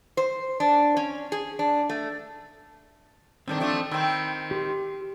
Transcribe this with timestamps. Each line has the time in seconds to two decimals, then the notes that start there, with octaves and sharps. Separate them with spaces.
0.17 C5
0.60 D4
0.97 C#4
1.32 G#4
1.59 D4
1.89 A3
3.48 G2 D#3 C4 D4 A4
3.60 F3 A3 D4
3.91 D#3 C4 G5 B5 E6
4.51 G4 C6